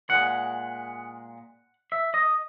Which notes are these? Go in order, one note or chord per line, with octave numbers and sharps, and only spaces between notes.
A#2 G#3 F#5
E5
D#5